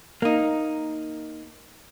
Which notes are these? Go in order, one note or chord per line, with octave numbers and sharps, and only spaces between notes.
A#3 D#4